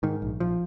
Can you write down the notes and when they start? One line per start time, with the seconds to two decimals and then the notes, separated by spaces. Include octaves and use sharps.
0.03 G#2 D#3
0.22 A#1
0.40 A#1 F3